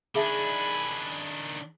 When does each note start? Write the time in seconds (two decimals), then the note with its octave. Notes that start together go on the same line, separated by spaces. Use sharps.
0.15 D#3 D4 G#4 E5 G#5 A5 B5